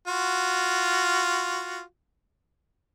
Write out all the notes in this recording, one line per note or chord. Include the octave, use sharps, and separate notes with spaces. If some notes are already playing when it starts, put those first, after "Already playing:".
F4 F#4